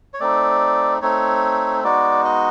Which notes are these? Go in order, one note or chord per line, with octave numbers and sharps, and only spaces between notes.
C#5
A3 C4 D#4 D5
A3 C4 D#4 C#5
G#3 B3 D#4 F#4 D5
D#5